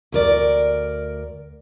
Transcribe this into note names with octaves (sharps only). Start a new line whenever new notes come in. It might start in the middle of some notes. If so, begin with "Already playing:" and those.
D2 A#4 D5